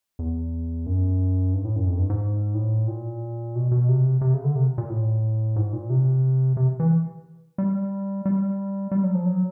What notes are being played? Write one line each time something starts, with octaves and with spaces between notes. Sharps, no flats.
E2
F#2
G2
A2
F#2
F2
G2
G#2
A2
A#2
B2
B2
C3
C3
C#3
D3
C3
A#2
A2
G#2
A#2
C3
C3
E3
G3
G3
G3
F#3
F3
F#3